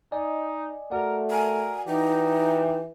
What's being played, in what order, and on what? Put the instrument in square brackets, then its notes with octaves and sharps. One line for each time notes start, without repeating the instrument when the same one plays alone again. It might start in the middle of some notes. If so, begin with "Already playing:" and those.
[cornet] D#4 [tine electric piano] D5 D#5 G#5
[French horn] A3 [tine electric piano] F#4 D5 F#5 [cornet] A#4
[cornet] A#4 [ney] G#5
[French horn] E3 [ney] D#4 [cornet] G4